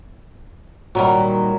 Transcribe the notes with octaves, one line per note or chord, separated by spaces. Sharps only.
A#2 D#3 F#3 G3 B5